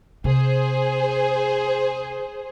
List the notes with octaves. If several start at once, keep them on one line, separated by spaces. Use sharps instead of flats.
C3 G#4 C5